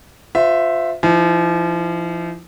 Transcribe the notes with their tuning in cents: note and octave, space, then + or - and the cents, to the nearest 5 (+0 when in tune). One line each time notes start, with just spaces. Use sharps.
F4 +25 C5 -25 E5 +0
F3 -30 D#4 +45